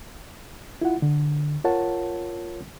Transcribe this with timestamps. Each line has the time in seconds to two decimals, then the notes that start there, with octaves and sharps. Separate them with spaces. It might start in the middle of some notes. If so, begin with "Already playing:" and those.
0.81 E4 F4 F#5
1.02 D3
1.64 F4 A#4 C#5 F#5 A5